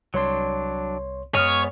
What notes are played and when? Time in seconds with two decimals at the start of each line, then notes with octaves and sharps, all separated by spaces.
0.14 C2 F#3 D4 C#5 C6
1.35 F#2 G#3 B3 C#5 D#6 F6 D#7